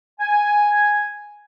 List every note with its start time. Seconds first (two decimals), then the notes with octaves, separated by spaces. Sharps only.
0.20 G#5